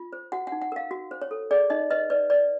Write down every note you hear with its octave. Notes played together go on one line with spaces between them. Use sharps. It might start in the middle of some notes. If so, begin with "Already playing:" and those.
Already playing: F4
C5
F#4 F#5
D#4 F#5
F#5
A#4 F5
F#4
C5
C#5
A4
G#4 D5
D#4 D#5
B4 D#5
B4 D5
B4 D5